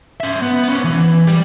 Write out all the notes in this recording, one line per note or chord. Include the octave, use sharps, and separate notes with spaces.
C#4 E5
B3
B3 C#4
E3
G3 G4